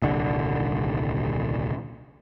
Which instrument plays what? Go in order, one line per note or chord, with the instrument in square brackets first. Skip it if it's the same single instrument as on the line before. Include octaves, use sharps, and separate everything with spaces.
[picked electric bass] D#1 C2 D3